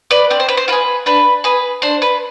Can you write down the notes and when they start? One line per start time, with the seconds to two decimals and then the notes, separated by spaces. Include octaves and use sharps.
0.11 B4 D5
0.30 C4 D5
0.40 C5
0.49 B4
0.57 C5
0.68 F4 G#4 B4
1.06 D4 B4
1.44 G#4 B4
1.82 D4 C5
2.02 B4